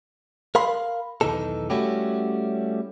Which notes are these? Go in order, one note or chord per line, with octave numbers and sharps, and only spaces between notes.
A#4 F5 B5 C6
B1 E2 D#3 E3 D#4 A4
G3 A3 C#4 E4 F#4 G4